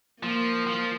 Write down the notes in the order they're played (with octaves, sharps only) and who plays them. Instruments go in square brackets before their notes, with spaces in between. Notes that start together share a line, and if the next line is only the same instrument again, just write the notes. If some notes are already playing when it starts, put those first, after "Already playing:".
[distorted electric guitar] F3 [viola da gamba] A#3
[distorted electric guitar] F3